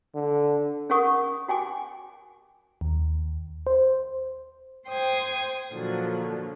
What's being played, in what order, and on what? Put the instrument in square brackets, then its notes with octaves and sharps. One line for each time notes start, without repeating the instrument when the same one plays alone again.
[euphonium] D3
[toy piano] C#4 G#4 A#4 F#5 C#6 D#6
F#4 G5 G#5 D6
[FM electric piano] D#2
C5
[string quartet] C5 G5 D#6 G#6
A#2 D3 F3 F#3